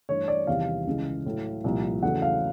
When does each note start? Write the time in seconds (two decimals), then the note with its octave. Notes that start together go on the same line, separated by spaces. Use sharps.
0.09 G2 E3 A3 C#5
0.28 D5
0.47 E2 C3 D#3 G3 F5
0.87 C#2 C#3 E3 G#3
1.26 A2 F#3 A3
1.64 C2 A#2 F3
2.03 E2 C#3 F#3 A3 F#5
2.22 F5